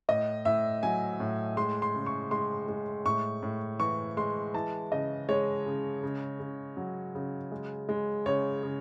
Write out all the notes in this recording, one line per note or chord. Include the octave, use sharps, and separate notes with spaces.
A2 D#5
A2 E5
F#3 G#5
A2
G#3 C6
C6
C#3
C#6
G#3 C6
G#3
A2 C#6
A2
E3 C#6
G#3 C6
E3 A5
C#3 D#5
G#3 C#5
C#3
C#3
C#3
F#3
C#3
G#3
G#3
C#3 C#5
C#3